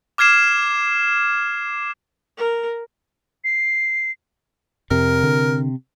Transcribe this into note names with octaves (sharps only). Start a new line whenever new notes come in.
D6 F6 G#6 C7 E7
A#4
C7
F2 C3 A#4
D3